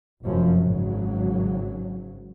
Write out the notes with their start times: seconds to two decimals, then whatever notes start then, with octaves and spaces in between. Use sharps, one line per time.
0.24 F1 F#2 F3 C#4
0.61 G#1 C#3 F#3